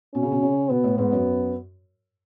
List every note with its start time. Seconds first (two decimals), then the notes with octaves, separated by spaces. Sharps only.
0.14 B2 C#4
0.23 C#3
0.31 B2
0.43 C#3
0.70 B2 B3
0.84 A2
0.98 G#2 B3
1.12 F#2